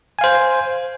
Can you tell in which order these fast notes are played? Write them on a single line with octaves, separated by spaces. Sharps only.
G#5 F5 C5